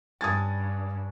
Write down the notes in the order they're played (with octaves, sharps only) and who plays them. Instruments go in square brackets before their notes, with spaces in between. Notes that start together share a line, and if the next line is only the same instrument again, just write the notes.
[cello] G2 [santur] G3 C#4 D4 [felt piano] D#6 G#6 A6